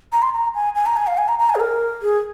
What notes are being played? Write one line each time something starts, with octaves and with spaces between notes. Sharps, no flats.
A#5
C6
A#5
G#5
G#5
A#5
G#5
F5
G#5
A#5
A#5
G#5
G#4
A#4
G#4